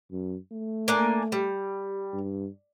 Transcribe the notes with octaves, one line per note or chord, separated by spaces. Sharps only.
F#2
A3
A#3 D4 G#5
G3
G2